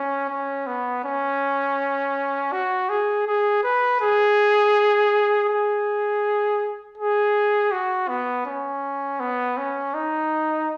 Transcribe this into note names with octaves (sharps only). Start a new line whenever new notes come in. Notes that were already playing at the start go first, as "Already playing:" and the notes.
Already playing: C#4
C#4
B3
C#4
F#4
G#4
G#4
B4
G#4
G#4
G#4
F#4
B3
C#4
B3
C#4
D#4